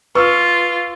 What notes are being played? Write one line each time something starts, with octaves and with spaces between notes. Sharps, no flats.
F4 B4 C#6 E6 F6